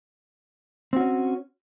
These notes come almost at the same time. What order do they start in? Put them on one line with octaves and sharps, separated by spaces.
C4 F#4 C#4